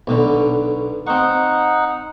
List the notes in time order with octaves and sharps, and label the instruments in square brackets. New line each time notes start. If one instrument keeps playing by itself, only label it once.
[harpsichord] B1 B2 D3
[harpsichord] C4 C#6 [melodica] D#4 F#5